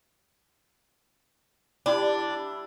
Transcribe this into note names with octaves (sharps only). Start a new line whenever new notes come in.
G3 D4 E4 G4